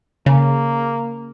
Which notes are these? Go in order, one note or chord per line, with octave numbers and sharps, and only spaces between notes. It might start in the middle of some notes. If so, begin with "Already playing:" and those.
C#3 A#3